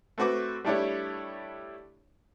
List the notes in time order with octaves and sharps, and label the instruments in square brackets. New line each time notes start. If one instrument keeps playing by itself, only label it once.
[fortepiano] A3 C4 F#4 B4 D6
G3 A3 D4 E4 G4 C#5